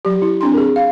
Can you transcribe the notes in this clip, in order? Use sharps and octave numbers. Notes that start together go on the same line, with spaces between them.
F#3 G4
E4
C4 D4 C6
G#4 A#4
F5